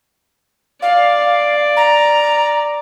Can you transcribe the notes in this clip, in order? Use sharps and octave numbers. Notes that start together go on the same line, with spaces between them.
D5 F5
A#5